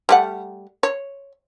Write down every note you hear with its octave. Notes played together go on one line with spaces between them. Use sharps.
G3 A3 F#5
C#5